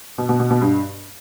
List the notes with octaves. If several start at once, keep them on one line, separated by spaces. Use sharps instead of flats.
B2
B2
B2
B2
G2